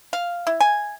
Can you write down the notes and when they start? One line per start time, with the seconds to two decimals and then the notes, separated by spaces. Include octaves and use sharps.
0.13 F5
0.47 E4
0.61 G#5